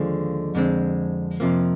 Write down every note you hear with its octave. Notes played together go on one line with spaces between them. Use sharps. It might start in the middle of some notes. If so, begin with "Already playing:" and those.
Already playing: D#2 D3 F3 G#3
F2 D3 G#3 C4
F2 C3 F3 A#3